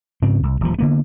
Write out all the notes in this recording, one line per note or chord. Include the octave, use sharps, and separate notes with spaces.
G#2 C#3 C4
C2
D#1 F3
D3 A#3 B3